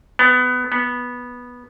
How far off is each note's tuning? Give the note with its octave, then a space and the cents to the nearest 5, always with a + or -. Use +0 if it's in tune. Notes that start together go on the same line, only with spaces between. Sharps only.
B3 +20
B3 -10